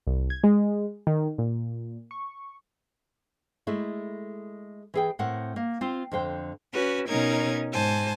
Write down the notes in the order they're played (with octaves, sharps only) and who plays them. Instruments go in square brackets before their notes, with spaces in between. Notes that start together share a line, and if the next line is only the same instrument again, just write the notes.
[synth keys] C2
G#6
G#3
D#3
A#2
C#6
[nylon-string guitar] G#3 A3 E4
E3 G#4 G5
A2 C4 A#4 F#5
A#3
C4 F4
F2 D3 C5 G5
[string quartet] C#4 F#4 B4
B2 C#4 D#4 A#4 G#6
G#2 C5 G#5 A5